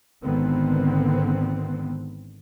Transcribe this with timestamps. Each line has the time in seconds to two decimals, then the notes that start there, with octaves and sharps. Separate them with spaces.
0.22 G#1 D3 D#3 B3 C4